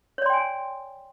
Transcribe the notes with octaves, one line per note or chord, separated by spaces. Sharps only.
C#5 D5 G5 G#5 C6